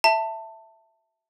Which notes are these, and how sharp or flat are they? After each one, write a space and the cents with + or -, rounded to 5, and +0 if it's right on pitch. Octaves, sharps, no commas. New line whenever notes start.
E5 +0 A5 +20